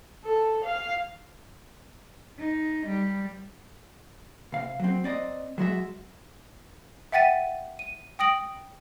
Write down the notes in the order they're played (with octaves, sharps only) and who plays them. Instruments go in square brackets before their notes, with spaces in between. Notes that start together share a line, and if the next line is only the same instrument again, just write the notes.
[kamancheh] A4
F5
[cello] D#4
G3
[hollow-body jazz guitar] C2 F5
F#3 C4
C4 D5 D#5
F#3 G#3 F#4 E5
[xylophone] E5 F#5 G5 A6 B6 D#7
D#7
G5 D#6 A#6 D7 F#7